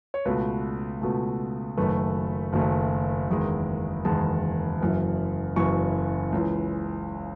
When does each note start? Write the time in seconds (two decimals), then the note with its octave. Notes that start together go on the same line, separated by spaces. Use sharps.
0.14 C#5
0.25 C#2 B2 A3 B4
1.01 C#2 B2 A3
1.77 F#1 F#2 D#3 A3 B4
2.53 F#1 F#2 D#3 A3
3.29 F#1 E2 D#3 G#3
4.05 F#1 E2 D#3 G#3 A5
4.81 F#1 F#2 E3
5.56 F#1 F#2 E3 C#6
6.32 C#2 C#3 E3